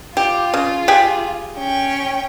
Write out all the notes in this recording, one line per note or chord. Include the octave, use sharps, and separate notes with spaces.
F4 G4
C#3
G4 G#4
C#4 G5